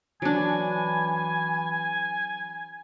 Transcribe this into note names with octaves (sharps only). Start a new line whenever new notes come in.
E3 F#3 D4 G#5